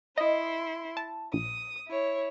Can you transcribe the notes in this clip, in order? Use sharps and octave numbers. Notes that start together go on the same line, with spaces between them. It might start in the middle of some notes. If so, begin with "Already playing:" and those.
E4 D#5 C6
A5
A#1 D#6
E4 C#5